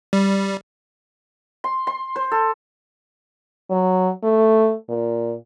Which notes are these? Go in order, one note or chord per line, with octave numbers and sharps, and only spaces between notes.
G3
C6
C6
C5
A4
F#3
A3
A#2